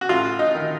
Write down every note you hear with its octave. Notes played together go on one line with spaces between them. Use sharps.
F#4
A1 F4
D#4
D#3